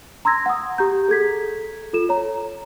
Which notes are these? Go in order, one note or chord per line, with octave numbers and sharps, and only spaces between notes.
A#5 C6 E6 G#6 A#6
F#5 D#6
G4 A#5 G6
G#4 A4 G#6 B6
F4 A4 E7
C#5 A#5